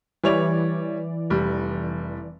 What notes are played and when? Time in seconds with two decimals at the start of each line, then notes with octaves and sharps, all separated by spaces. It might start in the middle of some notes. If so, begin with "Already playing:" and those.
0.24 E3 G3 C#5 D5 F7
1.30 F1 G3